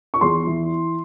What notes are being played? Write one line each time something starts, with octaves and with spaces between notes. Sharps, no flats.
C#6
E2 C6
E3